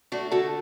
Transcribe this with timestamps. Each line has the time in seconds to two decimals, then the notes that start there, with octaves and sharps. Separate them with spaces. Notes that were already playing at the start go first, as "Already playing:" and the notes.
0.12 A3 D4 F#4
0.31 D3 F#4 A4